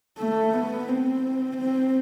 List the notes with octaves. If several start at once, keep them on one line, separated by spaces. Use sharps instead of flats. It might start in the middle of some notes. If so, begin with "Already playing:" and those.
A3
B3
C4
C4